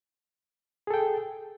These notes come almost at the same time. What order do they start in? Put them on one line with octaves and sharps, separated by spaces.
G#4 A4 G5